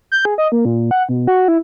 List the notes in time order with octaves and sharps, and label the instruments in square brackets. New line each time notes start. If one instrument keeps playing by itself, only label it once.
[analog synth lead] G6
G#4
D#5
A#3
A#2
F#5
B2
F#4
E4